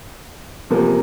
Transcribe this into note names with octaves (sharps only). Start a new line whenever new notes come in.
E2 C3 F3 A#3